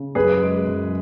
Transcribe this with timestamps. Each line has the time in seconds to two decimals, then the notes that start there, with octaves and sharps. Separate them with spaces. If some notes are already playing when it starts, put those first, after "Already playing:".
Already playing: C#3
0.15 F#2 G#4 B4
0.41 G#3
0.67 F#2